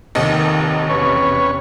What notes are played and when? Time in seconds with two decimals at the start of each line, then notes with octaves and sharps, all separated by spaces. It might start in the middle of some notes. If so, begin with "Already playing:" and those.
0.15 F1 D#2 C3 D#3 D#5
0.90 E2 C3 C#4 B4 C#5